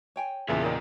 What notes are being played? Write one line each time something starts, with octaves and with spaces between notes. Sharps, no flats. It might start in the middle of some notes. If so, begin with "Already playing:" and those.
C#5 G5 G#5
E2 A#2 C#3 G4 G#4 A#4 E5
D#3 C#4 D#4 D5